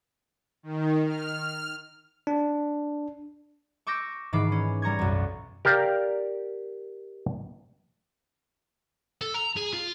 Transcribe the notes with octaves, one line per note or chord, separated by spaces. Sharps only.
D#3
F6
D4
C#6 D6 E6 G6 A#6
G#2 D#3 E3 B5 D6 C7
C#4
G3 A#5 C#6 G#6
B1 F#2
G4 A#4 D5 F5
A4
A#5
G#4
F4